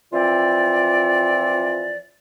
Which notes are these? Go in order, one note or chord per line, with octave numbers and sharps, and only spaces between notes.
E3 F3 C4 F4 D5